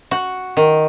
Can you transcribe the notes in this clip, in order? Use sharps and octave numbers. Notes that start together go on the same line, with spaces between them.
F#4
D#3